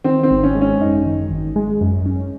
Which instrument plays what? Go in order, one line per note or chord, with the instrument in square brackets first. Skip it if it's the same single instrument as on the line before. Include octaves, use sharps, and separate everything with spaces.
[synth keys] D#3 [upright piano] C4
[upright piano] C4
[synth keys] G#1
[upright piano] C#4
[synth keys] G#3
[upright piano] C#4
[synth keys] F#2 [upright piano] D#4
[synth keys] D#3
G#1
G#3
F#2
C#4